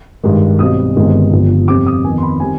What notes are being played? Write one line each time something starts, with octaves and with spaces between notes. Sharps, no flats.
G2 D#3 G#3
B1 B2 G3 C4 D#6
G1 G2 D#3 G#3 C4
G1 G2 F3
F2 C3 G3 C4 D6
D#6
F2 D#3 B3 G#5
C6
B5
D#3 G3 C4 G#5